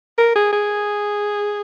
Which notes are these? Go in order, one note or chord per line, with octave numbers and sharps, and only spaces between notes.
A#4
G#4
G#4